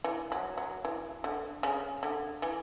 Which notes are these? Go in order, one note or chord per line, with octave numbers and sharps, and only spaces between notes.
E3
F#3
F#3
E3
D3
C#3
D3
E3